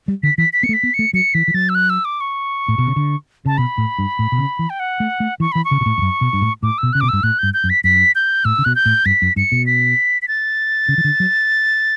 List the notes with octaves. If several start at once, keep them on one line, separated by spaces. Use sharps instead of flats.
G3
D3 B6
E3 B6
B6
B3 C#7
A3
B6
B3
C#7
A3
F#3 C#7
E3 B6
E3
F#3 A6
E6
F#6
E6
D6
C#6
A2
B2
C#3
D3
C#3 A5
B2 B5
A2
G2
A2
B2
C#3
E3
G5
F#5
A3
A3
E3 C#6
E3 B5
C#6
C#3
B2
A2
E2
F#2
B2
G2
A2
A2 D6
B2 E6
C#3 F#6
B2 D6
G2 E6
A2 F#6
G2 G6
G6
F#2
B6
F#2 B6
G6
A2 E6
C#3
B2 F#6
G6
A2
G2 B6
F#2
G2 C#7
B2
B6
B6
A6
C#3
E3
D3
F#3